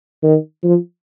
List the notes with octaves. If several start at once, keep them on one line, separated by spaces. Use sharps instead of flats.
D#3
F3